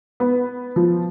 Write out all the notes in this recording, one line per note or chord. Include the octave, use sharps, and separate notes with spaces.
B3
F3